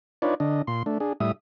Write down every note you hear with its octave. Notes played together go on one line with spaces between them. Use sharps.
D4 D#4 F4 B4 C#5 D5
D3 D4 D#5
A#2 C6
A3 D4
D4 G#4
A2 G3 E5 D#6